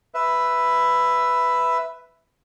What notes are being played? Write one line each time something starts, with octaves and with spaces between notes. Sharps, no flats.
B4 E5